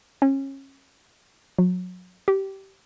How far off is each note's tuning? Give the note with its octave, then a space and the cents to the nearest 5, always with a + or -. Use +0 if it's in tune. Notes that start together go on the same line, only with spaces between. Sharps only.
C#4 -30
F#3 -30
G4 -20